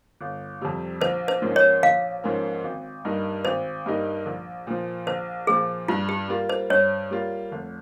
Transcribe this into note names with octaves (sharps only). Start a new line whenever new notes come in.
G1
F2 C3 G3
A#1 C5
C5
G#2 F3 A#3 C#4
C#5
A#1 F5
G#2 F3 A#3 C#4
G#1
G2 G3 A#3 D#4
G#1 C5
G2 G3 A#3 D#4
A#1
A#2 F3
A#1 C5
A#2 F3 G#4
G2 F4
G4
G3 A#3 F4
C5
G2 C#5
G3 A#3 F4
F1